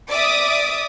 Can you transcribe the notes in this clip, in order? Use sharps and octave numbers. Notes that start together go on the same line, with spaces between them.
D5 E5 D6 D#6